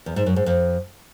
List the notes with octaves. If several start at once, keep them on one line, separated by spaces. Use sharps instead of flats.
E2
G#2
F#2
G#2
F2